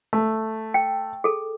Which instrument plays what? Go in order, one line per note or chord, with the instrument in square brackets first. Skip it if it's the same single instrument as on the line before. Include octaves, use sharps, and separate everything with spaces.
[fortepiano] A3
[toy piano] G5
G#4 A4